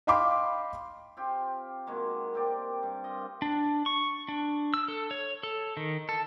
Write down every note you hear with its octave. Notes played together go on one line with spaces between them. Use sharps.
D#5 F5 G5 B5 C6 D6
C4 F4 G4
B2 D#3 G#3 A#3
A#3 C4 G4 D5
G2
F4 D#5
D4
C#6
D4
E6
A4
C#5
A4
D#3
A4